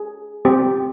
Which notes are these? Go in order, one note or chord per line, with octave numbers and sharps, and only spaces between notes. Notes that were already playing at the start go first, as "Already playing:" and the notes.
Already playing: G#4
C4 G4